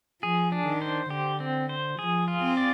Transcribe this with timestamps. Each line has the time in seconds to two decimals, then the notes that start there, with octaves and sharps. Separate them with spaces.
0.23 F3 G#4
0.52 D4
0.67 D#3
0.82 C5
1.10 D3 G4
1.40 C4
1.69 C5
1.99 F3 G#4
2.28 F4
2.43 C4
2.57 D5